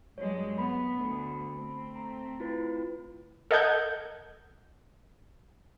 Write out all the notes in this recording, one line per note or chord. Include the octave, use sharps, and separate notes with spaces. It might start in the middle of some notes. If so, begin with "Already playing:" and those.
G2 F#3 G#3 C#5
B3 B5
D2
A3 C4
A#5
E4 F4 B4
A4 A#4 D#5 F#5 G6 G#6